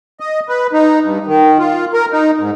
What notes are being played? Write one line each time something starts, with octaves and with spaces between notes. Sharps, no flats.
D#5
B4
D#4
G2
D#3
F4
A#4
D#4
G#2